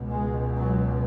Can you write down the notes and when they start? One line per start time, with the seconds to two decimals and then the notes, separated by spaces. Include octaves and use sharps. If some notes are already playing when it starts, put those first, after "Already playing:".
Already playing: C#2 B2
0.10 G#3
0.56 F#3